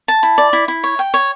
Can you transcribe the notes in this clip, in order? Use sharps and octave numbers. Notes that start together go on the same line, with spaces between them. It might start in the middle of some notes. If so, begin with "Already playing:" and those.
A5
E4
D5
E4
E4
C#5
G5
C#5